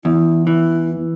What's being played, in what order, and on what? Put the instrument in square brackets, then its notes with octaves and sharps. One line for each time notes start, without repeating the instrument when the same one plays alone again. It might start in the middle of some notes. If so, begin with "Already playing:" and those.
[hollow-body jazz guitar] E2 [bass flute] E4
[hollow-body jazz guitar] E3 [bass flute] E4